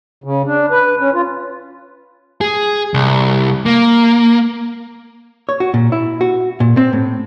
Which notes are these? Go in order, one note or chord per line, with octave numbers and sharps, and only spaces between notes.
C#3
D4
B4
C#4
F4
G#4
C2
A#3
C#5
F#4
A#2
E4
F#4
A#2
C4
A2